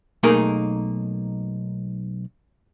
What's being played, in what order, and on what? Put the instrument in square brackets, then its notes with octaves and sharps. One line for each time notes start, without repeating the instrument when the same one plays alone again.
[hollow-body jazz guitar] B1 A3 A#3 D#4 G#4 A#4